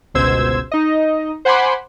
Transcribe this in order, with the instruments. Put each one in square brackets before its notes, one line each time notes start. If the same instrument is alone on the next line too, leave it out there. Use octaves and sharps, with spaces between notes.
[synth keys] G1 C#2 B2 C5 E6 G#6
D#4 D#5
C5 F#5 G#5 B5 C6 D6